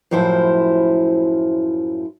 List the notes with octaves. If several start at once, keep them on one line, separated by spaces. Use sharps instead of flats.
F#2 A2 F3 E4 C5